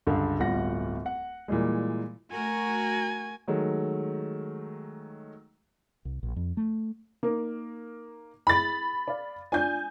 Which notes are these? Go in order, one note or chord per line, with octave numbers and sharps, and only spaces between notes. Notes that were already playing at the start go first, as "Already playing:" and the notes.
C#2 G2 D3
D1 G1 G3 F4 F#5 A#6
F#5
A#2 E3 G3 G#3
A3 F#4 A#4 G#5
D#3 F#3 G#3 A3
C2
A#1
F2
A3
A#3 D#4 A#4
E4 G#4 B5 A6
D5 F5
D4 F4 D5 G#5 G6